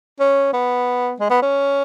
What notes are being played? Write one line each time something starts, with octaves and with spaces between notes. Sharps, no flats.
C#4
B3
G#3
B3
C#4